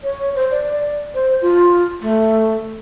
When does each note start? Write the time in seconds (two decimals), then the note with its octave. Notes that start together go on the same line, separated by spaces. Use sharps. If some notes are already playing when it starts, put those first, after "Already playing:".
0.03 C#5
0.35 C5
0.51 D5
1.14 C5
1.42 F4
2.02 A3